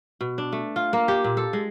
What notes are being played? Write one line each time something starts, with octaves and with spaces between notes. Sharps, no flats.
B2
D4
A3
F4
A#3
G4
A#2
A4
G#3